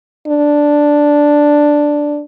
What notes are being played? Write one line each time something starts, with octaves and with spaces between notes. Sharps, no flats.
D4